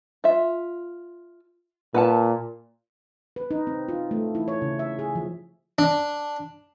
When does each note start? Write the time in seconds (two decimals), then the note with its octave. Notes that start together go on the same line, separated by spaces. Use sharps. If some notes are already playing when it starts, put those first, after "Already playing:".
0.24 F4 E5
1.94 A#2 B4 F#5 A5
3.36 B4
3.51 D#4
3.67 C4
3.88 F4
4.11 A3
4.35 E4
4.48 C#5
4.62 C#3
4.79 E5
4.99 G#4
5.15 F3
5.79 D4